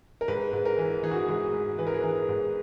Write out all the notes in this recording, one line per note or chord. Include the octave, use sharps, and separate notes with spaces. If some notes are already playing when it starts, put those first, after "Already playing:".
A#4
G#2 B4
G#2
A#4
E3
E3 G#4
F#4
G#4
G#2
G#2
E3 B4
A#4
G#4
E3 A#4
G#2